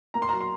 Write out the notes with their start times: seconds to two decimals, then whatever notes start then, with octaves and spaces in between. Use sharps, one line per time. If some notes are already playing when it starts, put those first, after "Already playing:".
0.14 A#3 A#5
0.22 C6
0.29 F#3 A#5
0.41 C6